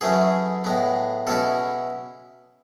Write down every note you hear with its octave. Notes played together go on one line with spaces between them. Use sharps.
F#2 E3 A3 C#4 G#4
A2 G#3 B3
B2 G#3 C#4 E4 A4